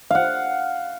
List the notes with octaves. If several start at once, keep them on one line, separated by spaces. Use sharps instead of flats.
F5 F#5